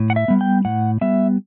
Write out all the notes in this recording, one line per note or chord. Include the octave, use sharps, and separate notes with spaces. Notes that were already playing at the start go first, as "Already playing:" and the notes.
Already playing: A2
F#5
E5
G3 B3
G5
A2 F#5
G3 B3 E5